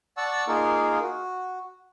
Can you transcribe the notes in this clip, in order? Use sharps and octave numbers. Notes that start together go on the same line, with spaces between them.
D5 F#5 A5 C#6 E6
A#3 D#4 F4 G#4 A#4
F#4